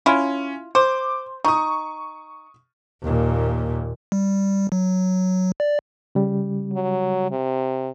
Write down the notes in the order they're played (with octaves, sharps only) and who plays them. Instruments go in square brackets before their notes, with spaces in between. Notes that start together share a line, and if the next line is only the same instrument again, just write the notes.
[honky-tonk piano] C#4 [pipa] E4 F4
[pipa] C5 [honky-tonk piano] D6
[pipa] D#4 [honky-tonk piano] C#6 D#6
[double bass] D#2 A#2
[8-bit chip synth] G3
F#3
D5
[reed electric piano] C#3 G3
[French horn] F#3
C3